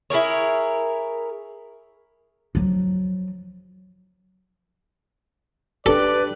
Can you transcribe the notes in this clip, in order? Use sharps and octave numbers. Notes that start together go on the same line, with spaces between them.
E4 G#4 A#4 C#5
F3 F#3
D4 G4 A4 B4 D5